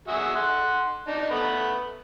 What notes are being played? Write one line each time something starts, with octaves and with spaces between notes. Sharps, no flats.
F#4 G#4 E5
F#5 C6
D4 D#4
A3 B3 B5